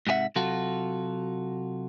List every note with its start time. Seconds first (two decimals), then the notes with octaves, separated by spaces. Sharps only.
0.07 G#2 C3 G4 E5 F#5
0.36 C3 F#3 F4 F#4 A4